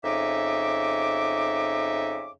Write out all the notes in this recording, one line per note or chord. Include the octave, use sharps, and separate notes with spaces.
F2 C#3 D#4 E5 D6